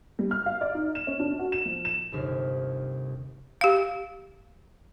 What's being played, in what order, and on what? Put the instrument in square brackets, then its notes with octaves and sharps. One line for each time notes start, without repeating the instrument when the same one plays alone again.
[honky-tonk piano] G3
F6
F5
D5
D#4
E7
C#4
D4
F#4
E7
F3
E7
[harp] G1 D#2 C3 F6
[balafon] G4 F5